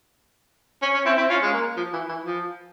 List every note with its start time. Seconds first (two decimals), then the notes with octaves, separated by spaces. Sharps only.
0.82 C#4
0.94 C#4
1.05 C4 E4
1.17 C4 E4
1.29 C#4 F4
1.42 G#3
1.53 A#3
1.77 F3
1.93 E3
2.09 E3
2.24 F3